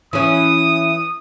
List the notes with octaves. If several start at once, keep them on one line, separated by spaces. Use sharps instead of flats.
E3 C#4 D#6